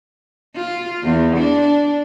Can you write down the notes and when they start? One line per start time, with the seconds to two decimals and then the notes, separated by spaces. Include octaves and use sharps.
0.56 F4
1.03 E2
1.36 D4